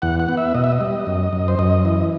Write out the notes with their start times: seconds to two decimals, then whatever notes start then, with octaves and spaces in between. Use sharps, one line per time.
0.02 E2 F#5
0.20 F#5
0.29 B3
0.37 E5
0.54 B2 D#5
0.64 E5
0.72 D#5
0.81 G3
1.07 F#2
1.33 F#2
1.48 C5
1.59 F#2 D#5
1.85 E3